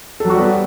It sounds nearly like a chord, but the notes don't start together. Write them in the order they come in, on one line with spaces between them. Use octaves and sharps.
A4 F#3 F#4 G3 B3